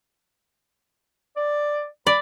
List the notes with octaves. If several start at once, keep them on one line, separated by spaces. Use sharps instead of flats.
D5
D5 B5